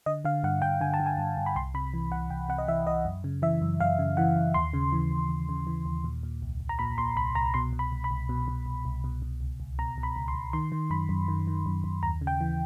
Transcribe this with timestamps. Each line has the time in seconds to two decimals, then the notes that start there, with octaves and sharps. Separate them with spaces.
0.06 D3 D#5
0.25 D3 F5
0.43 G2 F#5
0.62 G2 G5
0.81 D3 G#5
0.94 A5
1.00 D3
1.06 G#5
1.18 G2
1.38 G2
1.46 B5
1.56 C2 C6
1.74 C3 B5
1.94 E3
2.12 C2 F#5
2.30 C2 G5
2.49 C3 F#5
2.58 D#5
2.68 E3 E5
2.86 C2 D#5
3.05 F#2
3.24 C#3
3.42 E3 E5
3.61 F#2
3.80 F#2 F5
3.99 C#3
4.17 E3 F#5
4.36 F#2
4.54 D#2 C6
4.73 C#3
4.92 E3
5.11 D#2
5.29 D#2
5.49 C#3
5.67 E3
5.86 D#2
6.04 A#2
6.23 A#2
6.42 C2
6.60 C2
6.69 A#5
6.79 A#2 B5
6.98 A#2 C6
7.16 C2 B5
7.35 C2 A#5
7.54 B2 C6
7.73 B2
7.79 B5
7.92 C2
8.04 B5
8.11 C2
8.29 B2
8.48 B2
8.66 C2
8.85 C2
9.04 B2
9.22 B2
9.40 C#2
9.60 C#2
9.79 B2 A#5
9.98 B2
10.03 B5
10.16 C#2
10.28 C6
10.35 C#2
10.53 D#3 C6
10.72 D#3
10.90 F#2 B5
11.09 F#2
11.28 D#3
11.47 D#3
11.66 F#2
11.84 F#2
12.03 D#2 A#5
12.21 C#3
12.27 G5
12.41 E3